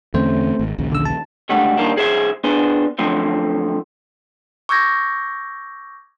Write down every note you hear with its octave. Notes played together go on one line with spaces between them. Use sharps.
E2 D3 A3 C4 C#4 C5
G#1
A#1 D#2 C#3
D3 E6
A5
C#2 D3 G3 A3 F#5
D#3 E3 G3 A#3 D4
C2 G#4 C5 E5
B3 D4 G#4 C5
F#2 D3 F3 A3 C4
C#6 D6 E6 G6 G#6 A#6